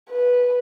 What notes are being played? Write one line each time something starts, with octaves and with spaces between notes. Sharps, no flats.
B4